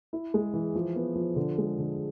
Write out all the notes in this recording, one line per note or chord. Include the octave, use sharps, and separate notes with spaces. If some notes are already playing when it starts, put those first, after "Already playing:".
E4
G#3
E3
F3
B3
F3
D3
G#3
D3